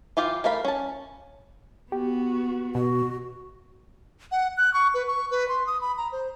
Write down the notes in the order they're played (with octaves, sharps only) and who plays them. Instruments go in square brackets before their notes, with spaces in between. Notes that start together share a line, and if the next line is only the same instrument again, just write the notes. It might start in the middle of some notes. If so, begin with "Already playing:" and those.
[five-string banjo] E3 F4 G4 F5
A3 A#4 F5 B5
C#4 A5
[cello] B3 F#4 [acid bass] G4
[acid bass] B2 [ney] F#4
[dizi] F#5
F#6
C#6
B4
C#6
B4
C6
D#6
B5
A#5
C5